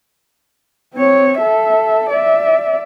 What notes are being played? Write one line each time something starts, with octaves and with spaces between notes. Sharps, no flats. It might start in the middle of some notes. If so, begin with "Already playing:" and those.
C4 C#5
A4 E5
D5 E5